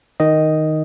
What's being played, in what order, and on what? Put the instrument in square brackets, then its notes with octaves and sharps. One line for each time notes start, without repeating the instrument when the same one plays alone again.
[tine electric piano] D#3 D#5